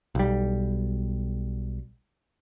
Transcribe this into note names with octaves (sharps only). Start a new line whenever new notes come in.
B1 G3